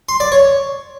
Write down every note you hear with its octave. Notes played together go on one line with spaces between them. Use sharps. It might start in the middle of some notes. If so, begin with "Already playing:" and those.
C6
D5
C#5